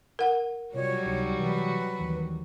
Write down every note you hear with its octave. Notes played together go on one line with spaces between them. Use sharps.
A#4 F#5
C3 F#3 G3 F4 F#4 C#5 D5
C#2 C3 D#4
C3 E3 B4
D#2 D#3 E3